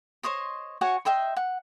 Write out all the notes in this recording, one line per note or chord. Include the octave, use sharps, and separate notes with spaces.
C5 C#5 D#5 C6
F#4 C#5 F#5 G#5
D#5 E5 G5 C6
F#5